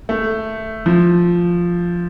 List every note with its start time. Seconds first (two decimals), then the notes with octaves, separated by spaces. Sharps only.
0.09 A3
0.86 F3